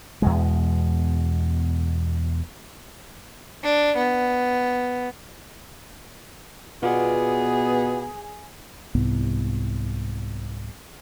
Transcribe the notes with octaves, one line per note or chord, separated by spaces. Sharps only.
E2 B2 G#3
D4
B3
B2 B3 F4 G#4 D5 F#5
C2 G#2 B3